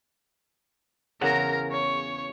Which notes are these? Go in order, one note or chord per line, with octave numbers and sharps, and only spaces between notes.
E2 C#3 A#4 F#5 A#5
C#5